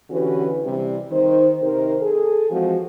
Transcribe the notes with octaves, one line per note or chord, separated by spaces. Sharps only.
D3 E3 C#4 F#4 G4 B4
C3 E3 G3
D#3 C5
C3 D#3 A#4 C5
G#4 A4
E3 F3 G#3 C4 F4 F#4